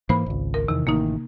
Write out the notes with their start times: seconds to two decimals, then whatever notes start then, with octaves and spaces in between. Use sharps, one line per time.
0.09 G#2 E3 A#3 C5 B5
0.26 G#1 C#2
0.54 A#4
0.68 E2 C3 D#3
0.87 A1 D#3 A#3 D#4